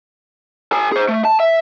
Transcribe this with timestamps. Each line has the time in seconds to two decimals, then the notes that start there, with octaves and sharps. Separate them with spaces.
0.72 A4 G#5
0.92 G#4 C5
1.08 A3
1.25 A5
1.40 E5